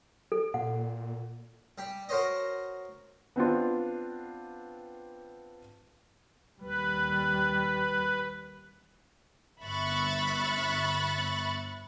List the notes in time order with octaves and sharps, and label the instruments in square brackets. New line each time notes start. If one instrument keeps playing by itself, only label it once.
[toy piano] A4
[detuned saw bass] A#2 [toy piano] F#5
[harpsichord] G3 G4
F#4 A#4 C5 C#5 D#5
[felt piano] B3 C4 D4 F4
[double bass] D#2 G3 [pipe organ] B4
[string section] G1 E5 B5 C#6 F#6 A6